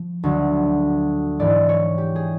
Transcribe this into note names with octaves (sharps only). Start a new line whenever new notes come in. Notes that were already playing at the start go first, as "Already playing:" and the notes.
Already playing: F3
D2 D3 F#3
G#2 E3 D5
C#5
G4
G#4